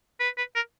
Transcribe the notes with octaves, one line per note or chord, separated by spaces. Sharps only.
B4
B4
A#4